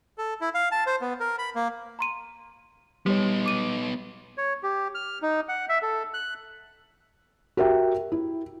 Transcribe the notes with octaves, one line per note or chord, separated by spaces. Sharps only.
A4
E4
F5
A5
C5
B3
A#4
B5
A#3
A#5 C6 D#7
G3 B3 D#4 G4 C#5
D6 D#7
C#5
G4
F6
D#4
F#5
E5
A4
F#6
F#4 G4 A#4 E5 G5
E4